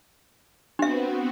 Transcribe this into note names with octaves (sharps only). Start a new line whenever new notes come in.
B3 C4 D4 F#4 E5